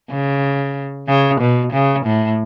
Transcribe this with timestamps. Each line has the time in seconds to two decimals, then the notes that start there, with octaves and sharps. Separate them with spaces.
0.10 C#3
1.08 C#3
1.41 B2
1.73 C#3
2.06 A2